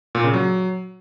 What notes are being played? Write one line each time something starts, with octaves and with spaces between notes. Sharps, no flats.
A#2
C#3
F#3